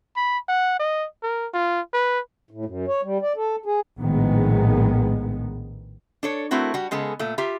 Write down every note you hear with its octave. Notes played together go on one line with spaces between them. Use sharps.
B5
F#5
D#5
A#4
F4
B4
A2
F#2
C#5
G3
D5
A4
G#4
A#1 A2 D#3 G#3 B3
D4 A4 C#5
A3 C4 E4 F#4 A#4
G3 F#4
C#3 G#3 B3 G#4 A4
A#2 A3
F4 G4 E5 A#5